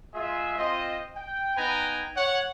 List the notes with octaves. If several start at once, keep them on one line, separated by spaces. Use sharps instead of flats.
G#3 F4 G#4 E5
C4 F4 C5 D#5
G5
B3 D#4 B4 G5 G#5 A#5
C#5 F#5